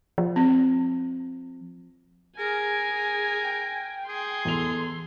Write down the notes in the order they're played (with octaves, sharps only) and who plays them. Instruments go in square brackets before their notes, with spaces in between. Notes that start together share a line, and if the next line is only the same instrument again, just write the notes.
[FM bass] F3
[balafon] C4
[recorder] G#4 [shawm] A#4 [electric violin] G#5
[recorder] G5
[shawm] G#4 [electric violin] C6
[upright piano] E2 F7 [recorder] A4